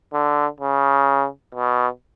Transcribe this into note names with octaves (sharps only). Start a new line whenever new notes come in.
D3
C#3
B2